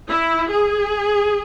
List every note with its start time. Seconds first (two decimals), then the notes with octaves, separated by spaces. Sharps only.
0.08 E4
0.51 G#4